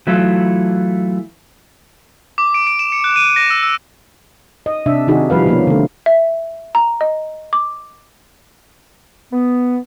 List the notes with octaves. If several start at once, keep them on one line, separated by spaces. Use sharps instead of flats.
E3 F#3 A3 E4 F4
D6
D7
D7
E7
C#7
F#6
D#7
A#6
E6
E6
D#5
C3 D4 E5
C3 D#3 D#4 F#4 G#4
F3 G3 B4 F5
B2 F3 A#3 C#4
D3 A3
E5
A#5
D#5
D6
B3